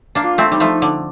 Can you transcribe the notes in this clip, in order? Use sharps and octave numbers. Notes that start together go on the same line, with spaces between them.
A#3 D4
F4
A3 C4
G3 D#4
F3 A3
D3